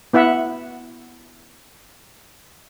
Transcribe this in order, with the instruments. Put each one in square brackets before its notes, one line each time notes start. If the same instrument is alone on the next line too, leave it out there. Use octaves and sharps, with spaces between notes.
[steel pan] B3 E4 E5 F#5